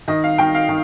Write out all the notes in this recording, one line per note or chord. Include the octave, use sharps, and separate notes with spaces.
D#3 D#5
F5
D#3 G5
F5
D#3